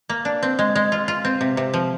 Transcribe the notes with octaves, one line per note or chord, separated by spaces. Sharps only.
A#3
D4
C4
G#3
G#3
F4
F4
C4
C3
C3
F3